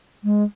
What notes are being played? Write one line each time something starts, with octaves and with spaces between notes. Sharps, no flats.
G#3